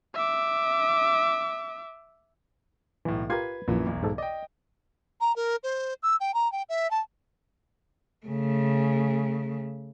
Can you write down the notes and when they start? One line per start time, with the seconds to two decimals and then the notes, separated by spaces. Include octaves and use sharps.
0.15 E5 D6
3.05 B1 A2 E3
3.30 F4 G4 A#4 B4 G#6 C7
3.68 A#1 F#2 A#2 E3
3.86 B1 E2
4.03 G#2 A4
4.18 D5 D#5 G5
5.21 A#5
5.36 A#4
5.64 C5
6.03 E6
6.20 G5
6.34 A#5
6.52 G5
6.69 E5
6.91 A5
8.26 C#3 A3